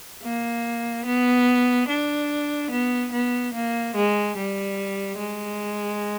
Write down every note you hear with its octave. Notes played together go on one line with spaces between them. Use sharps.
A#3
B3
D4
B3
B3
A#3
G#3
G3
G#3